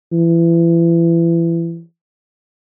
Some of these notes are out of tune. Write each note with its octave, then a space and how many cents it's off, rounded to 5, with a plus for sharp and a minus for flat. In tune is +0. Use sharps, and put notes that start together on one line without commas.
E3 +30